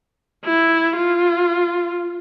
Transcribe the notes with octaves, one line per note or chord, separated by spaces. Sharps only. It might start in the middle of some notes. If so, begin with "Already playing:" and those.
E4
F4